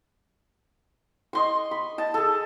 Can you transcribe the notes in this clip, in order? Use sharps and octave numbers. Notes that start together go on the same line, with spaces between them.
D#5 C6 C#6
B5
D#5 A5
G#4 A4